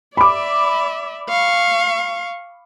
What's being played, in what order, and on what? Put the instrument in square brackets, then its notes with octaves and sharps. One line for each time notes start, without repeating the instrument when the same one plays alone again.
[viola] D5 E5 [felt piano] B5 D6
[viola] F5 C#6